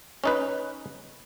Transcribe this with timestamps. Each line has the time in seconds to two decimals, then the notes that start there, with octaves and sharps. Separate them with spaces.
0.24 C#4 D#4 B4